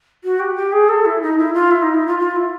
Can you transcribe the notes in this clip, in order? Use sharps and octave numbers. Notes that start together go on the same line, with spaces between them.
F#4
G4
G4
G#4
A4
E4
D#4
E4
F4
E4
D#4
E4
F4
F4
E4